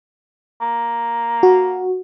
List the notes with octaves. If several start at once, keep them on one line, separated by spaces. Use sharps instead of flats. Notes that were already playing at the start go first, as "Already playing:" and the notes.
A#3
F#4